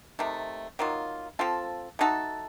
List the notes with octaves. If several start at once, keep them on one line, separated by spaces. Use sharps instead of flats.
C3 D#3 A3
D#3 F#3 A#3 F4
F3 C4 F4 A4
A3 D#4 F#4 A4